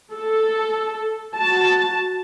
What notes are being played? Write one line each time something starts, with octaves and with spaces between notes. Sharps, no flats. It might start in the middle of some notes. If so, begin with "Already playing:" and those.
A4
F#4 A5